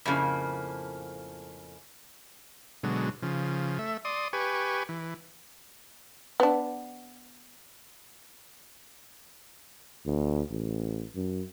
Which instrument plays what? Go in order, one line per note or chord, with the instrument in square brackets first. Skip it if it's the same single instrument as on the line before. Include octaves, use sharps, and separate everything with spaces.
[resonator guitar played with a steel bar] F2 A2 C#3 A#3
[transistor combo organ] B2 D3 F#3 G#3
C#3 F3
A3 E5
D5 C6 D#6
G4 B4 G#5 C#6
E3
[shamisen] B3 D4
[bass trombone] D2
A1
F#2